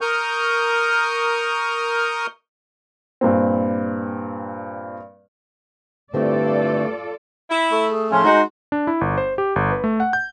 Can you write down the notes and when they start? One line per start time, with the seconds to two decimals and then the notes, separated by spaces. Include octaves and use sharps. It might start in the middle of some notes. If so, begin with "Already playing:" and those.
0.01 A#4 C#6 D#6 F6 G6
3.21 G2 A#2 C4
6.14 G2 D3 A3 C4 E4 F4 A4 D5
7.50 E4
7.72 A3
7.88 G#4
8.11 A2 C#3 F3 C#4 C6
8.24 G#3 D#4 F#4
8.72 D4
8.87 E4
9.01 G1
9.18 C5
9.38 G4
9.56 G1
9.72 B4
9.84 A3
10.00 F#5
10.13 G6